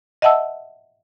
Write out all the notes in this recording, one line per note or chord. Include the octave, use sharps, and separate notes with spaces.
D#5 E5 F#5 A5 E6